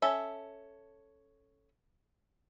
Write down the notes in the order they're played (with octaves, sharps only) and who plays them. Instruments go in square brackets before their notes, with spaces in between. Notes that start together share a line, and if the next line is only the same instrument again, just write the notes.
[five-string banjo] C#4 A4 E5